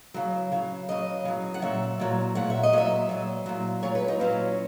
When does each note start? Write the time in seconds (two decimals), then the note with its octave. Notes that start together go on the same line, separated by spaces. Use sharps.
0.14 C#3 F#3
0.52 C#3 F#3
0.89 C#3 F#3 D#5
1.25 C#3 F#3
1.54 F#5
1.62 A#2 F#3 E5
2.00 A#2 F#3
2.35 A#2 F#3 F#5
2.50 E5
2.63 D#5
2.73 A#2 F#3 E5
3.09 A#2 F#3
3.46 A#2 F#3
3.83 A#2 F#3 C#5
3.95 B4
4.08 D#4
4.20 A#2 F#3 C#4